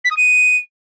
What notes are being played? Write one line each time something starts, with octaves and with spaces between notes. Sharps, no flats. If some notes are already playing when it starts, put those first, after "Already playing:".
B6
D#6
D#7